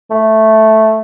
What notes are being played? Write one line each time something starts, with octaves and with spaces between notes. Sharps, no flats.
A3